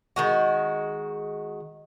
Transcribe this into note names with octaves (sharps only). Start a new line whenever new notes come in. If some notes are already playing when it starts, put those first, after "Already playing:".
D#3 G#3 F#4